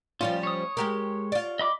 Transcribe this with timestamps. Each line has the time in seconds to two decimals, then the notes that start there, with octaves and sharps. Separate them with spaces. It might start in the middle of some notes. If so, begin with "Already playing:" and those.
0.21 F3 G3 C#4 F4
0.43 C#5 D#6
0.77 G#3 G4 A#4
1.32 F4 D5
1.59 D#5 B5 D6